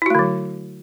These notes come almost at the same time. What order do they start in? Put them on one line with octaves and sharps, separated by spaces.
E4 F#4 A3 D3 F#3